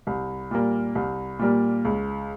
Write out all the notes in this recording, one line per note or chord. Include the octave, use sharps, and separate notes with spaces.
C2
A#2 G3 A#3
C2
A#2 G3 A#3
C#2